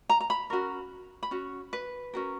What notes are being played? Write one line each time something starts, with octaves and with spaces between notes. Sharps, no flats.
A#5
A#5
B5
C#4 F#4 A#4
B5
C#4 F#4
B4
C#4 F#4 A#4